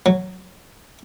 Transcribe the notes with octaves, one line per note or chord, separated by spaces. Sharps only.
F#3